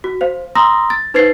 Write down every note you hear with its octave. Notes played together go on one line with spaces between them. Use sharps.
F#4
C5 F5
A#5 C6 D#6 E6 A#6
A6
D#4 B4 C5 G#6 A6 C7